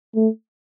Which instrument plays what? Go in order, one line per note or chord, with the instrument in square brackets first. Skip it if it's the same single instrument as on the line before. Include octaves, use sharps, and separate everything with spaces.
[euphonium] A3